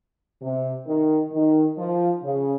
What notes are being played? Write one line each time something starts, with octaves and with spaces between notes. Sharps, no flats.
C3
D#3
D#3
F3
C#3